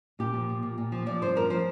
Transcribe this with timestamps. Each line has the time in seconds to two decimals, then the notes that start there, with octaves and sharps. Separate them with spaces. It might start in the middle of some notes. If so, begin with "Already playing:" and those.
0.19 A#2 G4
0.34 F3
0.49 A#2
0.62 A#2
0.78 A#2
0.92 F3
1.06 F3 D5
1.22 G2 C5
1.35 F3 A#4
1.50 F3 C5